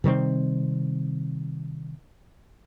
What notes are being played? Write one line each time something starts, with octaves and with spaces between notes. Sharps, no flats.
C3 D#3 G3 C4